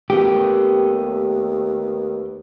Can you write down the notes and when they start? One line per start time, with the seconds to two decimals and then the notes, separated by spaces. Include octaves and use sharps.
0.10 D#2 A3 B3 G4